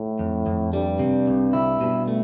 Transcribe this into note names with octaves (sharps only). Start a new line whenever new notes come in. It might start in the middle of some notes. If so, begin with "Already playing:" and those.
Already playing: A2
F2
F2
G2 G3
C3
C2
E4
G2 B2
A3